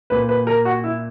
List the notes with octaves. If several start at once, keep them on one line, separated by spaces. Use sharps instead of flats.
A#2 B4
B4
A#4
F#4
E4